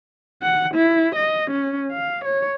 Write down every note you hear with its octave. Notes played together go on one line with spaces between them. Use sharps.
F#5
E4
D#5
C#4
F5
C#5